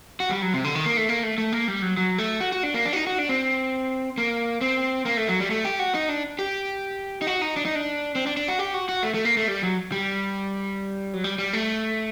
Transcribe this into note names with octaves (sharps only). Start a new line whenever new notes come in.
F#4
G3
F#3
C3
D3
D#3
A#3
A3
A#3
A3
A3
A#3
G3
F#3
F#3
A3
F#4
F#4
D4
A#3
D4
F#4
D#4
F#4
D4
C4
A#3
C4
A#3
A3
F#3
G3
A3
G4
F#4
D#4
D4
G4
D#4
F#4
D#4
D4
D#4
D4
C4
D4
D4
F#4
G4
F#4
F#4
A3
A3
A#3
A3
G3
F#3
G3
F#3
G3
G3
A3